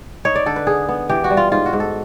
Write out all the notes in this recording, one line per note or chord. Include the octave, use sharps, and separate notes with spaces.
D#4 C#5
D5
D3 A4
B4
B3 G#4
B3
E3 G4
F#4
G3
F4
G#2 F4
F#4
G#2
A4